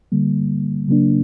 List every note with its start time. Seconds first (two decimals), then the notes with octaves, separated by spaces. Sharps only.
0.12 D3 G3 A#3
0.88 C#3 F#3 A#3 D4